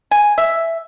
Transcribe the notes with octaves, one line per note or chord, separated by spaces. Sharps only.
G#5
E5